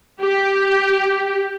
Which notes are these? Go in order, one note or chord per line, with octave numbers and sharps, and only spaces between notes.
G4